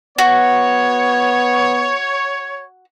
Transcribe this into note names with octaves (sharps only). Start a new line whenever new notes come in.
B3 F#4 C#5